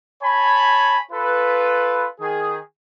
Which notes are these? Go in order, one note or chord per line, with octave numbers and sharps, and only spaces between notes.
C#5 G#5 A5 B5
F4 A4 B4
D#3 G#4